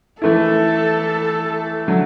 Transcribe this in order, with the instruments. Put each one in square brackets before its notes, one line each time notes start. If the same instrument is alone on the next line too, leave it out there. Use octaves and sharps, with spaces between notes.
[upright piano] E3 A3 E4 [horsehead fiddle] A4
[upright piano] D3 F#3